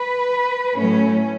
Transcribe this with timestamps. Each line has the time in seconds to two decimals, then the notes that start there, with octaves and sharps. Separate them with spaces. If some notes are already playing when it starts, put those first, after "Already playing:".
Already playing: B4
0.76 A2 F#3 A3 C#4